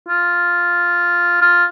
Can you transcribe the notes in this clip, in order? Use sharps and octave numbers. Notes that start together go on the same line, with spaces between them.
F4
F4